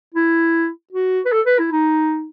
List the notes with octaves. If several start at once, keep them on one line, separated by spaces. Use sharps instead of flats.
E4
F#4
B4
A4
B4
E4
D#4